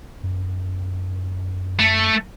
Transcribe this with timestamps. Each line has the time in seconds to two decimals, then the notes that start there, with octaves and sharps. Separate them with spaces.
0.23 F#2
1.79 A3